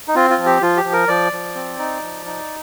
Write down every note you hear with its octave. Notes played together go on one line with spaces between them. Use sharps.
D#4
C4 F4
F4
F3
G4
F3 F4
G4
F3
A#4
F3 D5
F3
C4
D#4
F3
D#4